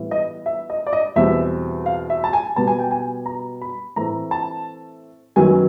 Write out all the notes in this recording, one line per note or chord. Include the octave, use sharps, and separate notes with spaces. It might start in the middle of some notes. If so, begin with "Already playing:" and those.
Already playing: A2 E3 G3 B3
D#5
E5
D#5
D5
D#5
E2 B2 G3 C4 E5
F5
E5
A5
G#5
B2 G3 B3 A5
G#5
G5
G#5
A#5
B5
A2 E3 A3 C4 A#5
A5
F#2 D#3 F#3 B3 G#5